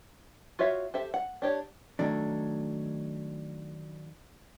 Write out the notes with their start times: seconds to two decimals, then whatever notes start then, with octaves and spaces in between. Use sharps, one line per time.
0.59 F4 F#4 C#5 E5 F5
0.94 G4 A4 C5 E5
1.14 F#5
1.42 D4 G4 C#5
1.99 D#3 F#3 A3 D4